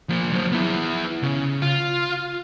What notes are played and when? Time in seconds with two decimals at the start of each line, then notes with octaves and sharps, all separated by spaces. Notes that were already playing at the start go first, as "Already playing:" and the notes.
0.09 F3 A#3
0.33 F#3 C5
0.52 B3 E4
1.23 C#3
1.62 F4